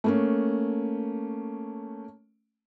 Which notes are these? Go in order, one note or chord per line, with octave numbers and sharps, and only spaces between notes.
A3 A#3 C#4